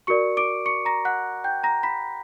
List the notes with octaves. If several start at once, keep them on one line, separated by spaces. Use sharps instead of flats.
F#4 A#4 D5 C#6 C#7
D6 D7
C#6 C#7
A#5 A#6
F#5 F#6
G5 G6
A#5 A#6
B5 B6